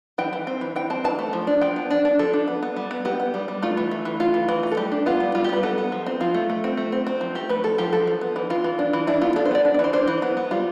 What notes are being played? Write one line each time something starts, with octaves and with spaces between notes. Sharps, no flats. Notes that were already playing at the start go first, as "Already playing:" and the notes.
E3 G5
E3
C4
E3
E3 G5
C4 A5
E3 A5
A3
F3
D4
F3 G5
B3
D4
D4
F3 A4
D4
B3
B3
G3
B3
B3 G4
B3
G3
G3
A3 F4
E3
A3
E3
A3 F4
E3
E3
A3
A4
G3 G4
D4
B3 F4
G3
G3 F4
G4
G3 B4
B3 A4
B3
F3
C4
F3 F4
A3
A3
C4
A3
C4
C4
F3
A3 G4
A3 B4
F3 A4
F3 G4
F3 A4
F3
B3
E3
E3 F4
E3
D4
E3
D4 E4
B3 F4
D4 A4
C5
B3 D5
D4
D5
E3 C5
D4 C5
E3
B3
B3
G3 F4